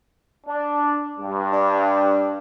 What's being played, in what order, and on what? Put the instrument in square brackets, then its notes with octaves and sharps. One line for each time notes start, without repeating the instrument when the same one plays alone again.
[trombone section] D4
G2
[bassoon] D4